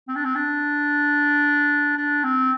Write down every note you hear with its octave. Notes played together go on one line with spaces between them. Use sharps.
C4
D4
C4
D4
D4
C4